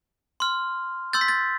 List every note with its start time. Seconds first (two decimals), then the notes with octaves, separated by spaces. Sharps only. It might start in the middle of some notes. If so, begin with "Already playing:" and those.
0.40 C6 F6
1.13 C6 E6 G6 A6
1.21 B6
1.28 A6